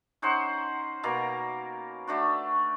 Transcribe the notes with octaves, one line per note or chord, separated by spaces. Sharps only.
C#4 D#4 C5 F#5
B2 A#3 A#4 A#5
A3 D4 F#4